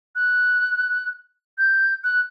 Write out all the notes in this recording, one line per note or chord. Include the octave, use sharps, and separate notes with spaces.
F#6
G6
F#6